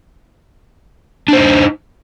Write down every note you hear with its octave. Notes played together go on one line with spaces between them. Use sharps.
D4 D#4 C5